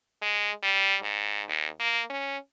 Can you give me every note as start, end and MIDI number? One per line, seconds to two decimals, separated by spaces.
0.22 0.52 56
0.63 0.96 55
1.02 1.43 44
1.49 1.68 39
1.80 2.02 58
2.10 2.37 61